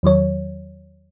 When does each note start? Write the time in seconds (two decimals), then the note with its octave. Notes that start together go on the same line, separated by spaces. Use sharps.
0.03 E2 D#3 F#3 C#5